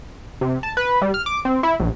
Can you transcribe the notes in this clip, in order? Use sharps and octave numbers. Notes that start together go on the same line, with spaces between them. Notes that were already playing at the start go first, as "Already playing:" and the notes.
C3
A5
B4
G3
F6
D6
C4
E4
A#1